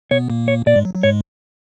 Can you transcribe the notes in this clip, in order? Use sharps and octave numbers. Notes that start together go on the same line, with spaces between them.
B2 B3 C#5
A#2 A#3
C#5
A#2 A#3 D5
G#2 G#3
F#3
F#3
G#2 G#3 C#5